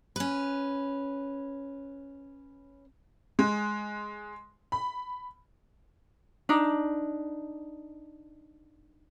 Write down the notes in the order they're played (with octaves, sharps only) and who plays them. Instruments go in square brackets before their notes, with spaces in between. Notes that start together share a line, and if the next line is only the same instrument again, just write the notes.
[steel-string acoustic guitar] C#4 B4
[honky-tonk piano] G#3
B5
[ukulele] D4 D#4